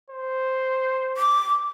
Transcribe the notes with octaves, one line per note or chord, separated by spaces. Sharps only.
C5
D6